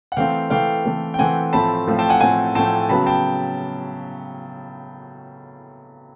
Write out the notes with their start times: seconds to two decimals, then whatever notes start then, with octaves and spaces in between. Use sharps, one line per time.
0.12 F#5
0.17 E3 A3 C4 F5 G5
0.50 E3 A3 C4 F5 G5
0.85 E3 A3 C4
1.14 G5
1.18 E3 A3 C4 F#5 G#5
1.53 A2 F3 A3 C4 A5 B5
1.87 A2 F3 A3 C4
1.99 G5 A5
2.09 F#5 G#5
2.20 A2 F3 A3 C4 F#5 G#5
2.55 A2 F3 A3 C4 G5 A5
2.89 C#3 F#3 B3 A5 B5
3.07 G5 A5